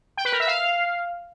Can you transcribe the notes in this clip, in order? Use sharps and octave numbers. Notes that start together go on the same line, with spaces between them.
G5
B4
A#4
E5
F5